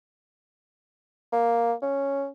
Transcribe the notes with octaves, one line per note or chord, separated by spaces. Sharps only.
A#3
C#4